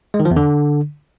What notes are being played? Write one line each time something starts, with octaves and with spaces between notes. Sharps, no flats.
G#3
D#3
F3
E2
D3